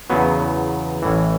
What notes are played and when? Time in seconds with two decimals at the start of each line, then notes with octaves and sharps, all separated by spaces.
0.10 E2 C#3 F#3 B3
1.02 A1 A2 E3